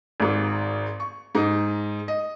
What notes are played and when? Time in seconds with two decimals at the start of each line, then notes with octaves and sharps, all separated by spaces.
0.20 G#1 G#2
1.00 C#6
1.35 G#2 D#4
2.08 D#5